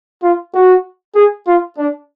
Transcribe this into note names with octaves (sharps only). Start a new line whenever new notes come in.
F4
F#4
G#4
F4
D4